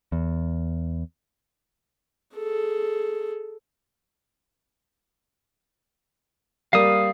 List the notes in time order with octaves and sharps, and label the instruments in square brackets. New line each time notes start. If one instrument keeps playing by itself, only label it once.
[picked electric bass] E2
[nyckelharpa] G#4 A4
[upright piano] G3 A#3 [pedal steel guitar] F5 D#6